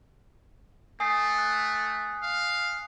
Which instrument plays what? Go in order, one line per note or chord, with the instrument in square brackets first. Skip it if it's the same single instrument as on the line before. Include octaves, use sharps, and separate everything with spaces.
[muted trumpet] A3 [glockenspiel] G#5 D#6 C7
[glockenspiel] F#6
[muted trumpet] F5